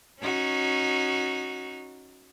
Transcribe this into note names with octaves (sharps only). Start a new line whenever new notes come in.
C#4 D#4 F#4